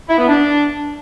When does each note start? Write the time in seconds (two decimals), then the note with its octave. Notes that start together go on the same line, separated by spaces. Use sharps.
0.08 E4
0.18 B3
0.28 D4